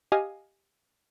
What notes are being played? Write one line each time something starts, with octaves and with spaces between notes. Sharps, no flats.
G4 D#5 F5 G#5 D#6